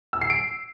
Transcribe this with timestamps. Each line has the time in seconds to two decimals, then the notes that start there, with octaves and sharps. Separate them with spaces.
0.13 E6
0.21 C7
0.30 D7